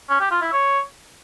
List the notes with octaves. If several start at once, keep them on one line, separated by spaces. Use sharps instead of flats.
C#4
G4
F4
E4
C#5